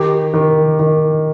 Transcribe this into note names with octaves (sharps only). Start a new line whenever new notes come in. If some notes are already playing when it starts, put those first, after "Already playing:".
Already playing: D#3 G4
D#3
D#3